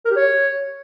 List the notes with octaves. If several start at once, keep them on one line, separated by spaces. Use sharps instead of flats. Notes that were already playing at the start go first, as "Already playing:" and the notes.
A#4
G4
C#5